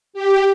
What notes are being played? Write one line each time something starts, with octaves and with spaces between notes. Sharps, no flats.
G4